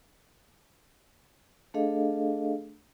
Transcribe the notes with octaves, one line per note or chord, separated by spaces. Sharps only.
A3 D4 G#4 A4 D#5 F5